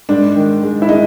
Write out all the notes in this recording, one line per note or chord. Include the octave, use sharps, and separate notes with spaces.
G#2 D4
D#3
G#3
E4
G#3 D#4